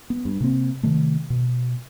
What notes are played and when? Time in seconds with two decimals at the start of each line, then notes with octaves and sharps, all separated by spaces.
0.10 B3
0.25 G2
0.40 C3 A#3 C4
0.83 C3 D#3 A3
1.30 B2